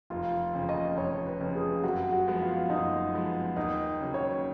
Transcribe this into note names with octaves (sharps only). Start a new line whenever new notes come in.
F1 F4
F2 C#3 F3
D#5
F1 C#5
B4
F2 C#3 F3
G#4
F#2 F#4
F#4
F3 G#3 B3
F4
F#2 D#4
F3 G#3 B3
D#2 D#4
C#3 F#3
C#5